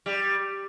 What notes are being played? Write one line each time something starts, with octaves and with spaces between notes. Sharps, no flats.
G3